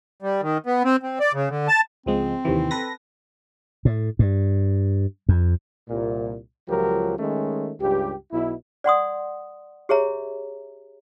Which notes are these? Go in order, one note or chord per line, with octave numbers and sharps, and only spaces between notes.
G3
D#3
B3
C4
C4
D5
C#3
D3
A5
C#2 F3 G#3 C4
D#2 C3 E3
A4 B4 A#6
A2
G2
F2
C2 A#2
C#2 F3 F#3 G4 A#4
D#3 G#3 A3 C#4
C#2 G2 G4
B1 B2 E4
D5 F#5 C6 D#6
G4 G#4 C#5 E5 A#5